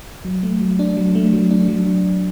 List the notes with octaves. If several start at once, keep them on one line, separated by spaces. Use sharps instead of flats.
F#3
A3
F#3
D4
F#3
A3
F#3
D4
F#3